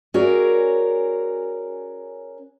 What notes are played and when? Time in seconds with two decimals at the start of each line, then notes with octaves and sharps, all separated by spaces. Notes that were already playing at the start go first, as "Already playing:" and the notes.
0.14 C#4 F#4 G#4 A#4 C#5 D5